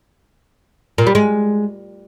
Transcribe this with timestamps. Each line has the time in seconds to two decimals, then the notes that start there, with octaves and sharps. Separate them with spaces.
0.98 A#2
1.07 G3
1.15 G#3